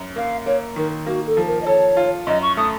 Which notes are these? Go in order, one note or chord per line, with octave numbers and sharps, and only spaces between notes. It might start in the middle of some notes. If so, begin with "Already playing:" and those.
Already playing: F#2
A#3 F5
A#3 C#5
D#3 A#4
A#3 F#4
A4
F3
A#4
D#5
A4 C#5
F4
F#2 D#5
C#6
A3 D#6